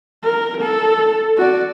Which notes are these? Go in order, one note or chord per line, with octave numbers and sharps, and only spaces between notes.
A#4
A4
F#4 D5